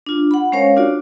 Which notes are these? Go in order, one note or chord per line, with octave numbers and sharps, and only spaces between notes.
D4 F4
F#5 B5
G#3 C#4 A#4 C5 C#5 F5
D4 F4 F#4 D5